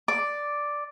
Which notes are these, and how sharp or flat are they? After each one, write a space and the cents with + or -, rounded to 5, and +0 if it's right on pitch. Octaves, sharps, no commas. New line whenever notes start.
D5 +0 D6 +0